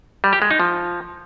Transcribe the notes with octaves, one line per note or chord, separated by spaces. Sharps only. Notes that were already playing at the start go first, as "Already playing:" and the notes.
G3
G4
G#3
D#4
F3